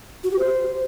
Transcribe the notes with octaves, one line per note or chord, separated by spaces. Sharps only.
F#4
G4
C5